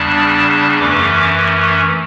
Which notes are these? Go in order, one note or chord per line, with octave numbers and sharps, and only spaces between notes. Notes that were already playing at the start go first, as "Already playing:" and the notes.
Already playing: E2 C#3 G3 D4 A5
F#2 E3 A3 C#4 D6